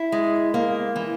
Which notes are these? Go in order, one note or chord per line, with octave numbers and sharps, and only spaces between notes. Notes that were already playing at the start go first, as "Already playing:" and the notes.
Already playing: E4
G#3
A#3
E3